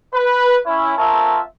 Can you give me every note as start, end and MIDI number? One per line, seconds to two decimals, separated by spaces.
0.14 0.58 71
0.66 0.95 61
0.66 0.95 64
0.97 1.40 60
0.97 1.40 65
0.97 1.40 70
0.97 1.40 73
0.97 1.40 76
0.97 1.40 81